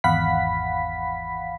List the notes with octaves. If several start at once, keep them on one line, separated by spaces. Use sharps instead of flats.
G#1 E2 F5 F#5 B5 B6